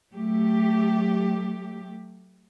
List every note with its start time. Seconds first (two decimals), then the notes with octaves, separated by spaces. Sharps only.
0.13 F#3 A3 G4